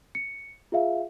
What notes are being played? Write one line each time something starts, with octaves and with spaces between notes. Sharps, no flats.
C#7
F4 G#4 E5 F5